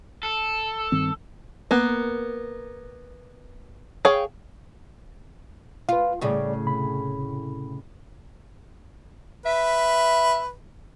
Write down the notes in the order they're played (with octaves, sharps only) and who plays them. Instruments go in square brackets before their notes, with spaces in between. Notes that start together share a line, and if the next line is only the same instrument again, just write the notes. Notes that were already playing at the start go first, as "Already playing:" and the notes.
[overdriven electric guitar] A4
[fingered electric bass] G2 D#3 C4
[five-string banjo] A#3 B3
G#4 C#5 F5 G5
[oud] F4 [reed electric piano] B4 F5
[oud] A2 C#3 [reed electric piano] G3 G#4 D5
[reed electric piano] C3 B5
[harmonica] B4 [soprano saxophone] E5